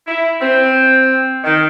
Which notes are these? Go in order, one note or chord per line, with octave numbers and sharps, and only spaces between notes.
E4
C4
D#3